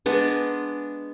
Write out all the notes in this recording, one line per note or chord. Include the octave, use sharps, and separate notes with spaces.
G#3 B3 D4